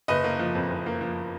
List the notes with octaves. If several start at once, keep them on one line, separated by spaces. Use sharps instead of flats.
F#1 B4 D#5
A#3
F3
F2
F#1
A#3
F3